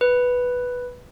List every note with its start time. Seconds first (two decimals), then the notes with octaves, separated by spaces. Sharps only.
0.01 B4